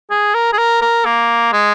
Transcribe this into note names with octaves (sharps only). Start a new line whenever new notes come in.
G#4
A#4
G#4
A#4
A#4
A#3
G#3